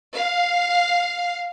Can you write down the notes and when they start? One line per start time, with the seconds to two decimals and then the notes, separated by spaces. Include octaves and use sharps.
0.14 F5